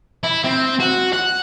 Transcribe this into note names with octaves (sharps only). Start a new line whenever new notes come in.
E4
C4
F#4
F#5